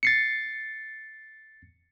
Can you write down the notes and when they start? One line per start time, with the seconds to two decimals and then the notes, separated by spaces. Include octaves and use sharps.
0.03 A6 C7 C#7